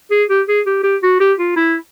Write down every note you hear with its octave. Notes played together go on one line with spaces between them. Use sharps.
G#4
G4
G#4
G4
G4
F#4
G4
F4
E4